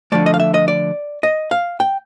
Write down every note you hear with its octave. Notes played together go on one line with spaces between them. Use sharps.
D3 F3 A3 D5
D#5
F5
E5
D#5
D5
D#5
F5
G5